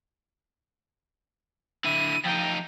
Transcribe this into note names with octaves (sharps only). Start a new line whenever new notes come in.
D3 E4 D#7
F2 D#4 G5